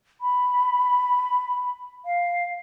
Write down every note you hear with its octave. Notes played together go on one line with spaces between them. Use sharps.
B5
F5